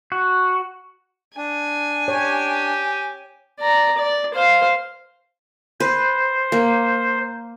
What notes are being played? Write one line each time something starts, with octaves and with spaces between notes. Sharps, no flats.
F#4
D4 G#5
G4 C#5
D5 A#5
D5
C5 F5
B4 C5
A#3